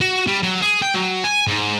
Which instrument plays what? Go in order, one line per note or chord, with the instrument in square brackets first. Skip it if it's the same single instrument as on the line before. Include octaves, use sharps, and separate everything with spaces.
[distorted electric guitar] F#4
G3
F#3
G#4
G5
F#3
G#5
G#2